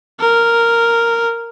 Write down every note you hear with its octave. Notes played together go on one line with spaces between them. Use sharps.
A#4